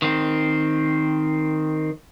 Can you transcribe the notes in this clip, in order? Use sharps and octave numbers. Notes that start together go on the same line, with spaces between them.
D#3 C4